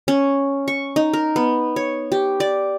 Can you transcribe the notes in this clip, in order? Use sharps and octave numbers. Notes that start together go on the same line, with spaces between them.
C#4
C#6
D#4
A#4
B3
C#5
G4
D5